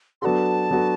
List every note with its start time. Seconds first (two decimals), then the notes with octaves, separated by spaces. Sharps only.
0.22 F#3 B3 D4 F#4 A4 A5 C6
0.71 F#3 B3 D4 F#4 A4